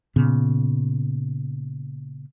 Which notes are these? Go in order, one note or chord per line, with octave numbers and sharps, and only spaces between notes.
A#2 C#3 B3